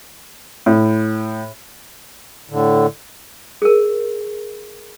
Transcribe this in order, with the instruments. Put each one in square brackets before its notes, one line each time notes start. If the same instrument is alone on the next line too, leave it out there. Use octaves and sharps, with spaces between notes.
[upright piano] A2
[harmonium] A2 D3
[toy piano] G#4 A#4